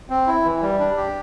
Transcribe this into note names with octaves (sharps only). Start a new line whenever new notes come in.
C4
E4
E3
G3
D4
G4